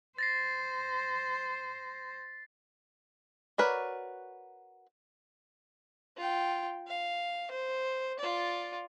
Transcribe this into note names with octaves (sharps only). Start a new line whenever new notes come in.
C5 A6 A#6 C7
F#4 A#4 B4 C#5 D5
F4 G5
F5
C5
F4 D5